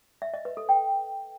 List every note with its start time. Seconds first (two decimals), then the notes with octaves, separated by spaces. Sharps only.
0.22 E5
0.34 D#5
0.45 B4
0.57 A4
0.69 G5